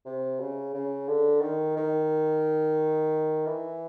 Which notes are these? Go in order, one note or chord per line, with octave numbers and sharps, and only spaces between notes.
C3
C#3
C#3
D3
D#3
D#3
E3